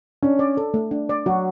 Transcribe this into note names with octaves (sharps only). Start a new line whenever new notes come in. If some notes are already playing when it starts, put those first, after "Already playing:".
C#4 D4
D5
A4
A3
D4
D5
F#3 F#4